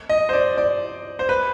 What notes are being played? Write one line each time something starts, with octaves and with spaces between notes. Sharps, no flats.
D#5
C5
D5
D5
C5
B4